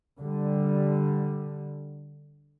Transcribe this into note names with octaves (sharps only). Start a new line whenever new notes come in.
D3 G3